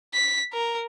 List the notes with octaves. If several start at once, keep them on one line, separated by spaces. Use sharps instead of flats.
B6
A#4